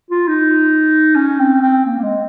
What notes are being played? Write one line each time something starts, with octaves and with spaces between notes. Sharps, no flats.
F4
D#4
C#4
C4
C4
A#3
A#3
G#3